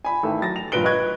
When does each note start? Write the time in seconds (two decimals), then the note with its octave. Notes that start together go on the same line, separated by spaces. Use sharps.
0.05 G#5 B5
0.23 A1 D#3 A4
0.41 F#3 A6 A#6
0.56 F7
0.72 G2 A#2 F3 B4 D7 G7
0.84 B4 D#5 C#6 F#6 G#6